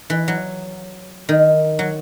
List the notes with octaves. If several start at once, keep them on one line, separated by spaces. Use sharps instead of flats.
E3
F#3
D#3
F#3